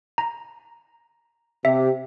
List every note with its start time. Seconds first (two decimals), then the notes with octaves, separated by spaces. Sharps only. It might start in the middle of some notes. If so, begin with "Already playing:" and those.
0.18 A#5
1.65 C3 G4 E5